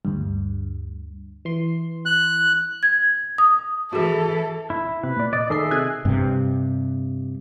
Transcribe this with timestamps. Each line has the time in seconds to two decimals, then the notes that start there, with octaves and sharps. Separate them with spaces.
0.05 D2 G2
1.45 E3 C6
2.06 F#6
2.83 G#6
3.38 D#6
3.93 E3 F#4 G#4 A4
4.70 E4
5.03 C3 B4
5.17 A#2 D5
5.33 D5 D#5
5.50 D#3 G#4 A4 D#5 E5 C7
5.71 C3 G#5 F#6
6.05 G2 C3